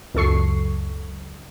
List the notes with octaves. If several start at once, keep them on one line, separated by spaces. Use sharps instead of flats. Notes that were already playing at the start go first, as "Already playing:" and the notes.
C#2 F#2 A4 C#6 C7